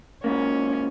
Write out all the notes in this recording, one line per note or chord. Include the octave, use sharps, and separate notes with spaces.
G#2 A#3 C#4